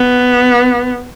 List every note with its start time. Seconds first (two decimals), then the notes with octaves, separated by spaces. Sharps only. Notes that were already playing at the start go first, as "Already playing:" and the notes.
Already playing: B3